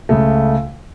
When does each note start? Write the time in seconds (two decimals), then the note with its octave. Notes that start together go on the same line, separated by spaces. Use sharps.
0.09 C#2 C#3 A3